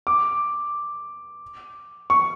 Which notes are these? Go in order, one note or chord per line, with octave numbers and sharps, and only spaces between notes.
D6
C#6